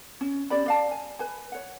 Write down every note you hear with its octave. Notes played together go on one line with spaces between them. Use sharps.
C#4
C#4 G4 D5 B5
D5 F5 A5
G#5
B4 G#5
C#5 F#5